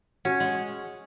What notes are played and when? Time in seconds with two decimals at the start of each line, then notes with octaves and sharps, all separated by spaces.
0.25 C#4 F#4 F#5
0.40 G#3